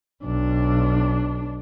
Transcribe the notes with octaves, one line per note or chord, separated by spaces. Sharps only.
B1 D4